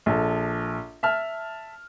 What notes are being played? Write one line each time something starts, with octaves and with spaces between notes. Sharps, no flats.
A#1 A4
E5 A5 F6